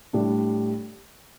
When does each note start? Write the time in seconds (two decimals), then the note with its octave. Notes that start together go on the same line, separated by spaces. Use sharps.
0.13 A2 G3 D4